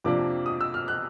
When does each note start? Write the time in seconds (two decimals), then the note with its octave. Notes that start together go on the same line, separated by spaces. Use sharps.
0.04 F2 C3 F3 A#3 D4 D6
0.46 D#6
0.61 E6
0.74 F6
0.88 F#6